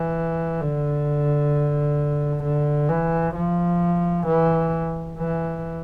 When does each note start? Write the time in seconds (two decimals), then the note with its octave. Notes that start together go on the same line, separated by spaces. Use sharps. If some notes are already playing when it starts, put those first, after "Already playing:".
Already playing: E3
0.61 D3
2.43 D3
2.89 E3
3.35 F3
4.27 E3
5.18 E3